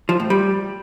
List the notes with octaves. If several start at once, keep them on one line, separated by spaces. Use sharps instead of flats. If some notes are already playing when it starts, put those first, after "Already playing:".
F3
A2
G3